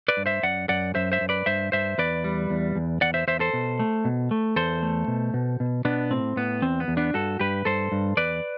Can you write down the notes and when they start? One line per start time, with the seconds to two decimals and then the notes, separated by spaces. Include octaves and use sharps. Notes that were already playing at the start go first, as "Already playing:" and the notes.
0.08 B4 D5
0.17 G2
0.26 C5 E5
0.43 F#2 D5 F#5
0.69 F#2 D5 F#5
0.95 F#2 C5 E5
1.12 C5 E5
1.21 F#2
1.29 B4 D5
1.46 G2 C5 E5
1.72 G2 C5 E5
1.98 E2 B4 D5
2.24 G3
2.50 E2
2.75 E2
3.01 E2 D5 F#5
3.14 C5 E5
3.28 E2 C5 E5
3.40 A4 C5
3.53 B2
3.79 A3
4.05 B2
4.31 A3
4.56 E2 A4 C5
4.83 A3
5.08 B2
5.34 B2
5.60 B2
5.85 B2 B3 D4
6.11 A2 C4
6.36 A2 B3
6.62 E2 C4
6.80 B3
6.88 E2
6.97 B3 D4
7.14 G2 F#4 A4
7.39 G2 G4 B4
7.65 G2 A4 C5
7.92 G2
8.17 E2 B4 D5